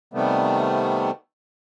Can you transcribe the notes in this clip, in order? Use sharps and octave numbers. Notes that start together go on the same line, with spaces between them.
C3 D#3 G3 A3 B3